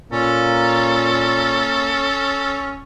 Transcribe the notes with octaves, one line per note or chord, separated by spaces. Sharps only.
A#2 A#3 C#4 A4